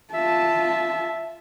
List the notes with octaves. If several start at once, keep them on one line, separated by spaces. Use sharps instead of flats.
F4 E5 A5